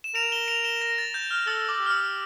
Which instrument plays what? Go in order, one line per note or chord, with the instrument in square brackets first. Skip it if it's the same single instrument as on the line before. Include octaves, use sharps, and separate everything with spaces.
[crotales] E7
[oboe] A#4 [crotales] D7 F7
[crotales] E7 G7
D7 F7
E7 G7
A#6
A6
G6
F6
[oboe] A4 [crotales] E6
[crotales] D6
[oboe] G4
[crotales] F6
E6